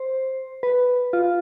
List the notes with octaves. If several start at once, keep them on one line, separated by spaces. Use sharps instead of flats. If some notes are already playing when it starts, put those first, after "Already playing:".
Already playing: C5
B4
F4